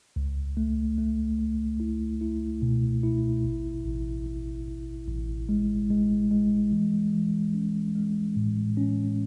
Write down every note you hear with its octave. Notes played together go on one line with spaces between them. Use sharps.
C#2
A3
A3
A3
E4
E4
B2
E4
A1
A1
A1
A1
A1
G#3
G#3
G#3
E3
E3
C#4
G#3
A2
C#4